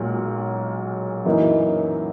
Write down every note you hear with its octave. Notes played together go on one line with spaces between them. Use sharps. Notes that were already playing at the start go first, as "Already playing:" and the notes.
Already playing: B1 A#2 G#3
F#2 E3 A#3 D#4